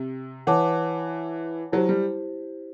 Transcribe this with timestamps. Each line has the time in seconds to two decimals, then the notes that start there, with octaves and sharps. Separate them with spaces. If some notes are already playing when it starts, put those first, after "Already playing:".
Already playing: C3
0.47 E3 C#5 F#5 A5 D6
1.72 F#3 E4 G4 C5
1.89 G3